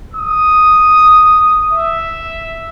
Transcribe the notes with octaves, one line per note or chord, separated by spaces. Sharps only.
D#6
E5